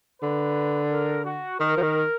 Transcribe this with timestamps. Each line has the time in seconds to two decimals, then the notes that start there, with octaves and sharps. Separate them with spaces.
0.22 D3 B4
0.91 A#4
1.26 F#4
1.60 D#3 A#4
1.77 F3
1.82 D#3